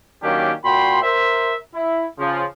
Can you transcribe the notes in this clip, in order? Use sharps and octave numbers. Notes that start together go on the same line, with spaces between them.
D#3 F#3 A#3 C#4 D4 G4
A#2 F#4 G5 B5 C6
A#4 C5 E5
E4
C#3 F3